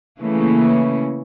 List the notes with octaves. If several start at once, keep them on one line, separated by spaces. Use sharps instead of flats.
C#3 E3 A3 A#3 C#4